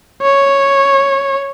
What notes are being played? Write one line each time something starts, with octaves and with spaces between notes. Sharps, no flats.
C#5